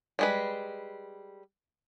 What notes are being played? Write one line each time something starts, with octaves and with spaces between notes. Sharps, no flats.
G3 G#3 B4